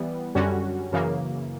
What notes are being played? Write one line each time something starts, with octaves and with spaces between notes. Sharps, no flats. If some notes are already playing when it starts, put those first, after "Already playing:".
Already playing: E3 G3 B3
F#2 D3 G3 C#4 F#4
F#2 C#3 E3 A#3